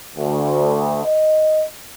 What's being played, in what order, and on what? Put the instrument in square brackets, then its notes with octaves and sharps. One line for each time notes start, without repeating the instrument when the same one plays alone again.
[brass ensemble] D2
D#5